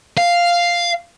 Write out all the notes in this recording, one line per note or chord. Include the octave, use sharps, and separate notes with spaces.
F5